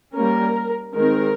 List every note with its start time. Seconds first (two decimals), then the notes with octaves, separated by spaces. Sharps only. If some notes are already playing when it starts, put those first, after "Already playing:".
0.14 G3 A#3 C#4 A#4
0.94 D#3 G#3 C4 A#4